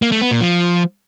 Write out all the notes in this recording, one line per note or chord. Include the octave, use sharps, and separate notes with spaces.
A#3
A3
B3
A#2
F3